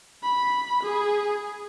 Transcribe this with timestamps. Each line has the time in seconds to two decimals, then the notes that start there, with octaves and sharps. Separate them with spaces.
0.23 B5
0.83 G#4